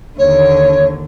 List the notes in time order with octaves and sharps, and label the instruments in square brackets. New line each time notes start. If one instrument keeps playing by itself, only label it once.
[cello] D#2 D3 [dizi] C#5